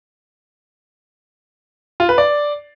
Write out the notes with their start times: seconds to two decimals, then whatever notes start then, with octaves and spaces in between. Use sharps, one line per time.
2.00 F4
2.09 B4
2.18 D5